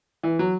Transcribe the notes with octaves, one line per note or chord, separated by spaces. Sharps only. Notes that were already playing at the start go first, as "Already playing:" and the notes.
E3
F#3